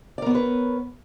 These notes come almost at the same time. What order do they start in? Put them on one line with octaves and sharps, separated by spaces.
D5 A#4 B3 C#5 B4